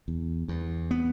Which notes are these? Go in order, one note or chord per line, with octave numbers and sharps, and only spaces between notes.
E2
E2
B3